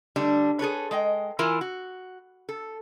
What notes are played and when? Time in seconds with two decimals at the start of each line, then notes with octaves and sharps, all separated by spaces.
0.16 D3 G3 A3 D4
0.59 G#4 A4 B4 C#5
0.91 G#3 D#5 G5
1.39 E3 E4 F4 A#4 G#5
1.61 F#4
2.49 A4